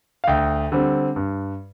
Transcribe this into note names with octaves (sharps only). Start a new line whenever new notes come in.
F5
D2 G5
D3 G3 C4
G2